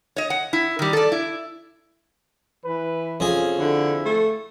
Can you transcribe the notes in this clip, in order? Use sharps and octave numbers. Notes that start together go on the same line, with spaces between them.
C#5 D#5
F#5
E4
D#3 G3
A4 D5
E4
E3 B4
F2 C#4 G#4
D3 E4
A3